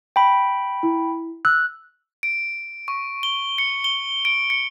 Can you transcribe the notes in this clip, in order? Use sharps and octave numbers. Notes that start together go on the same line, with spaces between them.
G5 B5
E4
E6 F#6
D7
C#6
G7
C#7
G7
D7
C#7